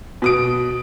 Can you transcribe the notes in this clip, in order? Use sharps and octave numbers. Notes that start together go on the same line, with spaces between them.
B2 D#6 D7